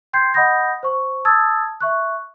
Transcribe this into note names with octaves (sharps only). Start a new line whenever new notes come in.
G5 C6 G6 G#6 C7
D#5 F#5 B5 D#6 G6 A#6
C5 C#6
A5 D#6 E6 G#6 A6
E5 C#6 F#6